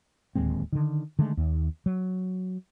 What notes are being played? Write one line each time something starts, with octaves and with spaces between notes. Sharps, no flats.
D1 D#2 G#3 C4
D3 D#3
D3 D#3 G#3 A3
D#2
F#3